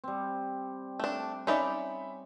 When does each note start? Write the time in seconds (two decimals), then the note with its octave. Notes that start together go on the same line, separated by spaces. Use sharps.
0.04 G3 C4
1.00 A3 D4
1.47 C#4 D#4 D5 E5 B5